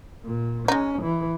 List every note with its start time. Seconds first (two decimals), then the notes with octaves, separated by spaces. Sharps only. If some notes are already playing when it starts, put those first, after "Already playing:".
0.25 A#2
0.68 G#3 C#4 D#4
1.02 E3